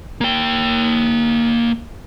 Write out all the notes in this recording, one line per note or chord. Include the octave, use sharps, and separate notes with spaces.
A#3 G5